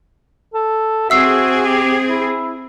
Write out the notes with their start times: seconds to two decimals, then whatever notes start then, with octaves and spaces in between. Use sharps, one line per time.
0.54 A4
1.10 C4 F#4 G#4 E5 E6 C7
1.66 G4
2.09 E4